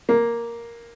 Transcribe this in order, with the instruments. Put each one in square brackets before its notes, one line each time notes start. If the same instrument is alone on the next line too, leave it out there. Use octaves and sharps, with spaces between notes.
[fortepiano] A#3